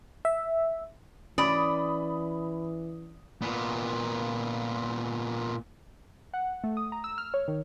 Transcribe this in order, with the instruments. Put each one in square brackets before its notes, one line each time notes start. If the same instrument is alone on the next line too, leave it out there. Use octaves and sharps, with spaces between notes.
[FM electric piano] E5
[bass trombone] E3 [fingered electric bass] C#4 [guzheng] D5 [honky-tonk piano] B5 D#6
[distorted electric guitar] A#2 B3
[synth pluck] F#5
A3
D#6
A#5
E6
F6
C#5
D#3